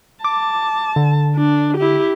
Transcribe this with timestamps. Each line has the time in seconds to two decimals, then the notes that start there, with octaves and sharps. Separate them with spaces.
0.24 A5 D6
0.96 D3
1.35 D4
1.77 E4 G4